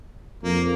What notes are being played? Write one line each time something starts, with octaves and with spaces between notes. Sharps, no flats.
F2 A#3